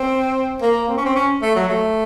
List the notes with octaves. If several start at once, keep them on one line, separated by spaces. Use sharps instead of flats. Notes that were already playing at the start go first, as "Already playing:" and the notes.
Already playing: C4
A#3
C4
C#4
C4
C#4
A3
F#3
A3